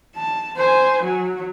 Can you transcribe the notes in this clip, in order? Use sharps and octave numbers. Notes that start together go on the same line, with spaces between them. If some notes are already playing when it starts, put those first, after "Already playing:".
A5
C5 G#5
F#3